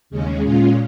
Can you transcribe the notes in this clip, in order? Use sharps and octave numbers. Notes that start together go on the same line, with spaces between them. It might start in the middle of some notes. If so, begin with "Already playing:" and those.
D#2 C#3 G#3 C#4
A#2 G#3 C#4 F4